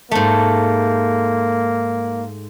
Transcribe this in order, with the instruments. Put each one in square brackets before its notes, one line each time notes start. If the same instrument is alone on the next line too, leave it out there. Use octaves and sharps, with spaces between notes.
[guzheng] G#2 A3 [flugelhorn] A#3